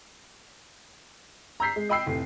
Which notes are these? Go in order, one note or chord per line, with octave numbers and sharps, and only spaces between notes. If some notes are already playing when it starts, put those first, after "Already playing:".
A#5 E6 G6 B6 C7
G#3
D#5 G5 B5 E6 C7
F1 A2